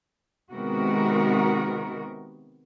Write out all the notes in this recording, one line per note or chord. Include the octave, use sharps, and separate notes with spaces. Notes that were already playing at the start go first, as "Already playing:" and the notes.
C3 D#3 G#3 B3 F#4 A#4